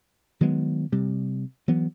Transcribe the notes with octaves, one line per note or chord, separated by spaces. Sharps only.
D#3 F#3 G#3 B3
C3 G3
E3 F#3 B3